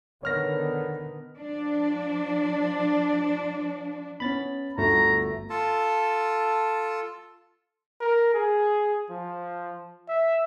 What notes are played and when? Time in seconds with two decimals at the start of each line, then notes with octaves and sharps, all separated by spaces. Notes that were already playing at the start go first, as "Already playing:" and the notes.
0.23 D3 D#3 B3 C#5 F6 A#6
1.37 F3 D4
4.20 B3 C#4 B5 A6
4.78 G1 D2 A3 A#5
5.50 F4 A4 A5
8.01 A#4
8.34 G#4
9.10 F3
10.08 E5